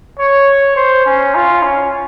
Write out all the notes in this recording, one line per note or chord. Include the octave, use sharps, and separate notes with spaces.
C#5
C5
C#4
F4
C#4